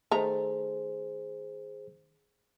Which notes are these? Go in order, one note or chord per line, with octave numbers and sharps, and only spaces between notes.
D#3 A3 G#4 C5 A#5